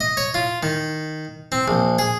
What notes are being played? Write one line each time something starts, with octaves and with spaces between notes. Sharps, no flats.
D#5
C#5
F4
D#3
C4
A#1
G#4